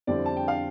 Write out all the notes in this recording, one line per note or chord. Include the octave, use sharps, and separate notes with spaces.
F2 D3 G3 C4 E4 D5
A5
G5
F5